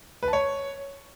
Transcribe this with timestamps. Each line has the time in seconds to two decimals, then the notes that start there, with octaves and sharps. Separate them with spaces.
0.23 B4
0.28 A5
0.33 C#5